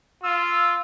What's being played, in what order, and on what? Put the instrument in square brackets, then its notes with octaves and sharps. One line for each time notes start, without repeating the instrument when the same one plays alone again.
[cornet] F4 [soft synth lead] E6